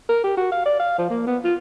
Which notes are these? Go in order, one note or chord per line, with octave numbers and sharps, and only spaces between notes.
A#4
G4
F#4
F5
D5
F5
F3
A#3
B3
F4